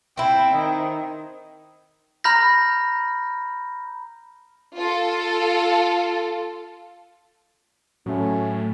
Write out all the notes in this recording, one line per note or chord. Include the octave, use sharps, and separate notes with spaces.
C4 E4 G5
D#3
A#5 B5 F6 G6 A#6
F4 A4
A2 F#3 A3 C#4